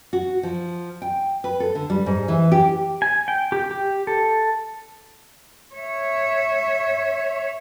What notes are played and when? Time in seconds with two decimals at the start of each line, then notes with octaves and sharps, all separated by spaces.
0.13 F#4
0.43 F3
1.02 G5
1.44 B4
1.60 A4
1.75 D3
1.90 G3
2.06 G#2
2.28 E3
2.52 G4
3.02 G#5
3.28 G5
3.52 G4
3.71 G4
4.07 A4
5.75 C#5 E5